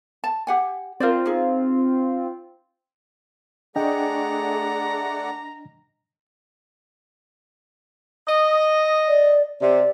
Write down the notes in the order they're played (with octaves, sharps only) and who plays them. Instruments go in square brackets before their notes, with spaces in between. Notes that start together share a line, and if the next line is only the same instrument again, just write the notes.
[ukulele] A5
G4 F#5 G#5
[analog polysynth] C4 F4 [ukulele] A#4 C5 D5
[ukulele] D#4 G#4
[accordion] A3 D5 F#5 [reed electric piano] D4 D#5 G5 [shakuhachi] G#4 [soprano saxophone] A#5
[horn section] D#5
[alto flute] D5
[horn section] C3 [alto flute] D5